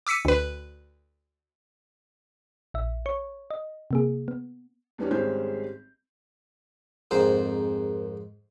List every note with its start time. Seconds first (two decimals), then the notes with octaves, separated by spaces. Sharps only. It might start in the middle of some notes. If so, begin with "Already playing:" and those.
0.07 D6 E6 B6 C#7 D#7
0.25 D2 B4
2.74 A#1 E5
3.06 C#5 C#6
3.51 D#5
3.91 C3 A#3 G#4
4.28 B3
4.98 E2 G3 B3 C#4 D4
5.11 G#1 G3 G#3 C#4 C5 G6
7.11 F2 G#2 C4 G#4 A#4 C5